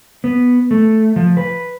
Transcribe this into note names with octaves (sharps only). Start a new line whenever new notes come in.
B3
A3
F3
B4